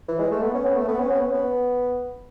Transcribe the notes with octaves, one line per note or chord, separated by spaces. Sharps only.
E3
G#3
A3
B3
C#4
B3
A3
B3
C#4
B3
C#4
B3